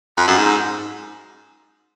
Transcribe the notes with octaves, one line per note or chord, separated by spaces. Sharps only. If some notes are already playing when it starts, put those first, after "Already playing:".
F2
F#2
G#2